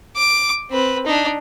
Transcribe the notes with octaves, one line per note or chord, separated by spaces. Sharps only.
D6
C4 B4
D4 D#4